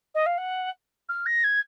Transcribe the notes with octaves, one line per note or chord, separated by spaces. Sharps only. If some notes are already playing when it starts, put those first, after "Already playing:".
D#5
F5
F#5
F6
A#6
G#6